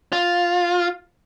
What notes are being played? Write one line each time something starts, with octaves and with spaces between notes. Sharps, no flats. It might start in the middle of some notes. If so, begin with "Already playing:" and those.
F4